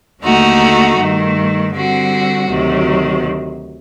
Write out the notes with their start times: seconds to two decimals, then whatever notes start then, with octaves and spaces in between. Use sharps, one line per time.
0.21 D#2 D3 A3 D#4 F#4
0.97 G2 D#3 A3
1.73 D3 G3 C4 F#4
2.48 D2 C3 D#3 F#3